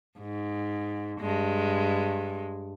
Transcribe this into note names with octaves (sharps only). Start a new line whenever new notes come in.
G#2
G2 G#3